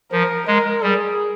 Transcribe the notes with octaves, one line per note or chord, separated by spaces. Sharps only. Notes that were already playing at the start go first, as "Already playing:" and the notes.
F3 A#4
G#3 A#4
G3 G#4